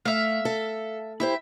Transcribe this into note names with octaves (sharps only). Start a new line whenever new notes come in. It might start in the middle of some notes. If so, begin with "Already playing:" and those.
A3 E5 F5
A4
E4 G4 C5 E5